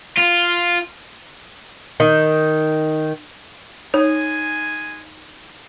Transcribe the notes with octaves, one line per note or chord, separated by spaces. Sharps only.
F4
D#3
G#3 D#4 C#5 G#5